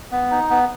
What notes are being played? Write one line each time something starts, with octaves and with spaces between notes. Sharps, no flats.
B3
D#4
B3